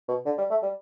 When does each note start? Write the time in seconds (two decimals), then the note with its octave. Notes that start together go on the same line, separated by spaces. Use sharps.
0.08 B2
0.26 D3
0.38 G3
0.50 A3
0.63 G3